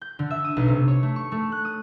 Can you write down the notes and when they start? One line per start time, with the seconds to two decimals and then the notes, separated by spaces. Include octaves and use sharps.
0.02 G6
0.19 D3
0.31 E5
0.44 D#6
0.57 B1
0.68 C3
0.88 C#5
1.03 A3
1.16 C#6
1.32 A3
1.52 F#6
1.65 D#6